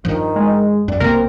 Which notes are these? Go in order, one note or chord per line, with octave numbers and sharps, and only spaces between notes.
G2 D#3 F3
G#3
F#2 D5
B1 C3 A#3 C4 A#4